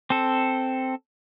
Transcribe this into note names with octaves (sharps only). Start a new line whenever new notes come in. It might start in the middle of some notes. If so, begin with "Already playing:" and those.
C4 A4